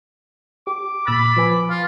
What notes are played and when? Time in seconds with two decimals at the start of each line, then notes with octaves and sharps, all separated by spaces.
0.67 G4 D6
1.07 A#2 B5 E6 A6
1.37 F3 B4 G#5
1.70 F4